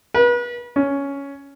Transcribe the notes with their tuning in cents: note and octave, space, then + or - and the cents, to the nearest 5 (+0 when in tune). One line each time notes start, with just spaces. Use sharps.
B4 -35
C#4 +10